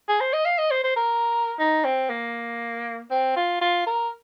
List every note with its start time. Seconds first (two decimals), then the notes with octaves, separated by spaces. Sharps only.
0.08 G#4
0.20 C5
0.33 D#5
0.46 F5
0.58 D#5
0.71 C5
0.84 C5
0.96 A#4
1.59 D#4
1.85 C4
2.10 A#3
3.11 C4
3.36 F4
3.61 F4
3.87 A#4